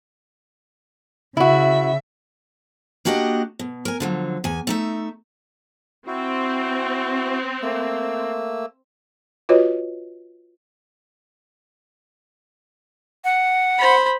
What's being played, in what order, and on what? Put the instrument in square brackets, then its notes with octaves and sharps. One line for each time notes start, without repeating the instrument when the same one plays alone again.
[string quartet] C#3 E5 [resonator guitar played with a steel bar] E4 F#4
[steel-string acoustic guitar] A#3 D4 F#4 G4 C5 D#5
B2
A#4 G#5
D3 F3 F#3
E2 G#5
A3 D#4 E5
[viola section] C4 [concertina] E4 F#4
[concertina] A3 A#3 E6
[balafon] F4 F#4 B4 C#5 D#5
[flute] F#5
[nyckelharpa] C5 B5